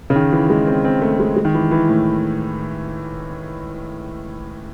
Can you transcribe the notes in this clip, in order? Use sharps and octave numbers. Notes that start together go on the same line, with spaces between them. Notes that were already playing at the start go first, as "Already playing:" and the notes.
C#3
D#3
E3
G#3
C4
C4
A3
G#3
G#3
D#3
E3
E3
A2